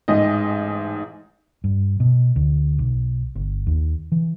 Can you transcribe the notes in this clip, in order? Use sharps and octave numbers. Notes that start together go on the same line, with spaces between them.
A1 G#2 G#3 D#5
G2
B2
D2
B1
G1
D#2
E3